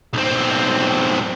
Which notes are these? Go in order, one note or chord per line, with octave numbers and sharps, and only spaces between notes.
B1 C4